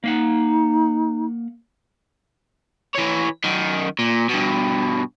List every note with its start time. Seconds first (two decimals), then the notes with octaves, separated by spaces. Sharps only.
0.04 A#3 D#4 F5 F#5
2.95 E3 C#5
3.44 F#2 D#3
3.99 A#2
4.30 G2 B2